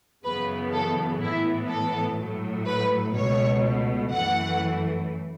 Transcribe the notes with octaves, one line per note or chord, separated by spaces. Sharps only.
F#2 C#3 E3 B3 B4
A4
A2 E3 B3 E4
A4
A2 F#3 A3
B4
C#2 B2 A3 C#5
F#2 E3 A3 F#5